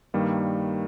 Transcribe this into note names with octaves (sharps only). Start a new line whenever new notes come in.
G2 D#3 G3 A#3